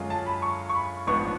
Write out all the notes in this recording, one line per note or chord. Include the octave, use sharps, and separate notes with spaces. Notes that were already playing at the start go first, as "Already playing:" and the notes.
Already playing: F#2 D3 G#3 C#4 F4
A5
B5
C#6
C#6
B5
A1 G#2 F3 B3 D4 C#6